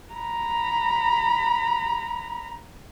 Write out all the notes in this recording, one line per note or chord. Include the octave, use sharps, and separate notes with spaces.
A#5 B5